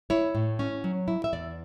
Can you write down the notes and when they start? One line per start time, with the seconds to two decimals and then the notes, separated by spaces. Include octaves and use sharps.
0.10 E4 C#5
0.35 A2
0.59 C#4
0.84 F#3
1.08 E4
1.24 E5
1.33 E2 D5